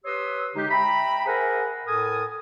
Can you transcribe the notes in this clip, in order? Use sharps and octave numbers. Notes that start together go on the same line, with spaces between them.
G4 B4 C#5 C6 D#6 E6
D3 G#3 D#4 G4
E5 G5 A#5 B5
G#4 A#4 C5 E5 F#5 G#5
A2 A4 A#4 G#5 D#6